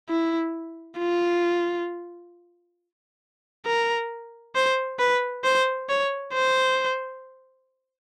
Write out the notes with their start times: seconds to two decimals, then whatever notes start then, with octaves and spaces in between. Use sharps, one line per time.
0.09 E4
0.98 F4
3.66 A#4
4.55 C5
4.99 B4
5.44 C5
5.89 C#5
6.34 C5